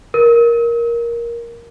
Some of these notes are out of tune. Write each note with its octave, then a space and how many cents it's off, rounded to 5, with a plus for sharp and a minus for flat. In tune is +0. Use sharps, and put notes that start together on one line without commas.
A#4 +10